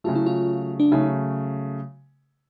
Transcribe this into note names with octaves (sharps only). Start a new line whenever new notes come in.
C#3 F#3 A3 F4
E4
F4
D4
C#3 F#3 A3 D#4